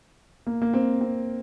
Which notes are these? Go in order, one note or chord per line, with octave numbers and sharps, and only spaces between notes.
A#3
A#3
C4
C4